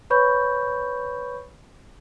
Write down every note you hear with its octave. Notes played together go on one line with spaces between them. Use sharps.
B4 C#5 B5 C#6 G6